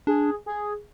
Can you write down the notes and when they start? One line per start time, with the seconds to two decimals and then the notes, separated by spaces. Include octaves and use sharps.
0.07 D4 G#4
0.46 G#4